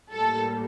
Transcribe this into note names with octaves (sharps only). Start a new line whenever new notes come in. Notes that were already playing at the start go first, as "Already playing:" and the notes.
A2 G3 A#3 A4